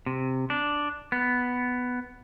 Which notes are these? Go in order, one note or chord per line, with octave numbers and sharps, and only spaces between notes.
C3
D4
B3